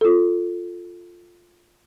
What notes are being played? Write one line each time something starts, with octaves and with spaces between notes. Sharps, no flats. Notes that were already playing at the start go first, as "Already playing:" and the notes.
F4 A4